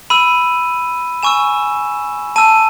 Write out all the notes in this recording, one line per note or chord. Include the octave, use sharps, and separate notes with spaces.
B5 E6 D#7
G#5 C#6 E6 E7
A5 E6 D#7